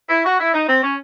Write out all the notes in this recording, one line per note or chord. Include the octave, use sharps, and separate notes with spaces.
E4
F#4
E4
D#4
C4
C#4